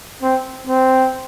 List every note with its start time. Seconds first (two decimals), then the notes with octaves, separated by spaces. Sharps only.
0.23 C4
0.67 C4